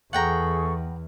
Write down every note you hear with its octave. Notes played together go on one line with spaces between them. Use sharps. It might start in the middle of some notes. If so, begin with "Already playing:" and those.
E2 G#4 A4 F#5 G5 A#5 C#6